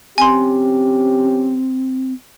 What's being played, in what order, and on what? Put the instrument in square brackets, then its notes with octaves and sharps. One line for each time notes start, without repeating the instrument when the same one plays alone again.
[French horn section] F3 C#4 G4 [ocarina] C4 [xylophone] G#5 C6